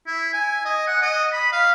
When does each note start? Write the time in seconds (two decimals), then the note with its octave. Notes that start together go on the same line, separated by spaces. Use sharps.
0.07 E4
0.33 G#5
0.65 D#5
0.87 F#5
1.02 D#5
1.32 B5
1.52 F5